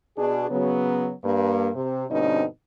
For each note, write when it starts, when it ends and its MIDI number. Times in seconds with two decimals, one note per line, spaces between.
0.17 0.46 47
0.17 0.46 62
0.17 0.46 68
0.50 1.12 49
0.50 1.12 54
0.50 1.12 59
1.24 1.69 43
1.24 1.69 58
1.75 2.04 48
2.10 2.45 43
2.10 2.45 47
2.10 2.45 50
2.10 2.45 60
2.10 2.45 61
2.10 2.45 63